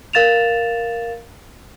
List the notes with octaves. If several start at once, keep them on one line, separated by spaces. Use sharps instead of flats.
A#4 F5 A6 E7 F7